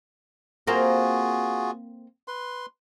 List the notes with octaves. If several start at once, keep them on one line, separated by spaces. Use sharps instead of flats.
A#3 C4 F4 F#4 G#4
B4 C6